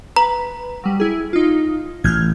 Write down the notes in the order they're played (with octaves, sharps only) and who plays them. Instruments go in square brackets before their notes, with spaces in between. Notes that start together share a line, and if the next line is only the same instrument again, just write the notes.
[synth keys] B4 [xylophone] A#5
[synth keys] F#3 G3
E4 G#4
D#4 F4
[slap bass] A1 [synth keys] F6 G6 G#6